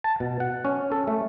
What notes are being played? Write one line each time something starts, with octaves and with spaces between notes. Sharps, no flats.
A5
B2
F#5
C#4
A4
A3